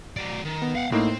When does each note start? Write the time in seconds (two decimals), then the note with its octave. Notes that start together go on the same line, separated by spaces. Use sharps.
0.17 F#3 D5
0.45 D#3
0.62 B3
0.76 F5 F#5
0.92 A2 A#3 C4 D#4